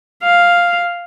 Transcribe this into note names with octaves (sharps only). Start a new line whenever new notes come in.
F5